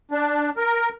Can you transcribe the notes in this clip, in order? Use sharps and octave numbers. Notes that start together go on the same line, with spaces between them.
D4
A#4